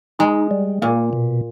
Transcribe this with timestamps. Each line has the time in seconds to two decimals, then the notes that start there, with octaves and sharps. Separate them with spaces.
0.19 G#3 D#4
0.51 G3
0.82 A#2 A#3
1.13 B2